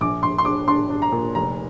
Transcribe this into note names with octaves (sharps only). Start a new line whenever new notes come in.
A#1 D6
A#1 C6
C6
D4 D6
D4 C6
D4
A#5
A#2
F1 A#5